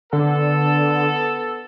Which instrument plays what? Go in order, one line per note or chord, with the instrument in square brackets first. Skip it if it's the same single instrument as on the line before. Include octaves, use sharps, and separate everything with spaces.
[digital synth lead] D3 [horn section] B3 A4